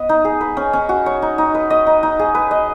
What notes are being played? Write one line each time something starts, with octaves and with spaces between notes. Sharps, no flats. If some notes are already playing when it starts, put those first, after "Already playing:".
Already playing: B3 B4 D#5
D#4
G#4
B4
C#4
C#4
F#4
C#5
D#4
D#4
B4
D#5
D#4
D#4
G#4
B4
D#5